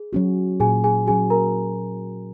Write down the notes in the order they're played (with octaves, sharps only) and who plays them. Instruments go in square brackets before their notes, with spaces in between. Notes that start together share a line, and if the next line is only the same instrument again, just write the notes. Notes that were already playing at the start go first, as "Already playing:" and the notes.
Already playing: [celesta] G#4
[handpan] F#3 C#4 F#4
[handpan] A#2 [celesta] G#4 G#5
[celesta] G#4 G#5
[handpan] F#3 C#4 F#4 [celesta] G#4 G#5
[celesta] A#4 A#5